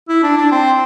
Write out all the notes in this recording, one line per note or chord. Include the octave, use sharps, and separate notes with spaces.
E4
D4
D4
C4